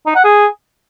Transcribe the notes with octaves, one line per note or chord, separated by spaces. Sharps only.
D#4
F#5
G#4